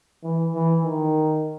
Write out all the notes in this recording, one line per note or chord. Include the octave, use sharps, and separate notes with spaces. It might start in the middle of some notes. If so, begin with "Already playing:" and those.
E3
E3
D#3